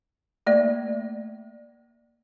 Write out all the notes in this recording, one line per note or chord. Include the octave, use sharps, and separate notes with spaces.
A3 A#3 D5